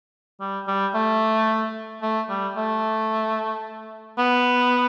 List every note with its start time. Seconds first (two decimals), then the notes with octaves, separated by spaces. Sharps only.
0.40 G3
0.67 G3
0.94 A3
2.02 A3
2.29 G3
2.56 A3
4.18 B3